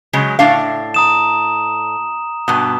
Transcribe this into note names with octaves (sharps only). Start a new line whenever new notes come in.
C#3 F#3 G#3
A2 D4 F5
A#5 D#6 E7
G2 B2 D#6